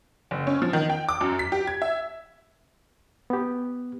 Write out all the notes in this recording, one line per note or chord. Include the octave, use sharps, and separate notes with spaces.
F#1
C#4
F3
D#3
G5
D6
F#2
B6
G4
G#6
E5
B3 G4